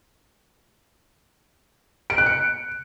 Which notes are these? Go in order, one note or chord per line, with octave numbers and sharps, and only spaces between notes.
D7
F#6
C#7